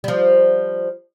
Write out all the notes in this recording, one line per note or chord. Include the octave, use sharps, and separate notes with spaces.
F3 G3